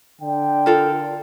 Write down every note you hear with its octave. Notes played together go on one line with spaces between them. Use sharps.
D3 G5
F4 A4 A#4